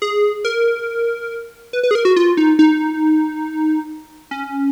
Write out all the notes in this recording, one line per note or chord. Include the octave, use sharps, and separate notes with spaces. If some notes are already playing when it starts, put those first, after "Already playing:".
G#4
A#4
B4
B4
G#4
A#4
F#4
F4
D#4
D#4
C#4